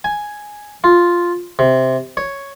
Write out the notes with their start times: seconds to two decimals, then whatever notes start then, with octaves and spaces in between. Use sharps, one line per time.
0.04 G#5
0.84 F4
1.59 C3
2.17 C#5